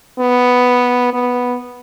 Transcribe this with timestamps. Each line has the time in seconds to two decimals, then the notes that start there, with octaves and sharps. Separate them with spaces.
0.19 B3
1.13 B3